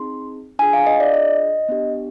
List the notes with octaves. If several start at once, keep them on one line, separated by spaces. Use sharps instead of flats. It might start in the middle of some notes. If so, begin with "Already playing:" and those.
Already playing: C4 D#4 G#4 C6
D4 F4 G#4 G#5
F5
D#5
D5
D#5
B3 D4 G4